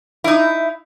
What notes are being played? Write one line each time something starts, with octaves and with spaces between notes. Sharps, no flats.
D#4 E4